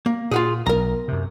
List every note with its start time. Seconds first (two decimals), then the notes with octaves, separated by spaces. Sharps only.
0.06 A#3
0.31 A#2 F4 F#4 G#4
0.66 B1 A#4 A#5
1.08 F#2 C3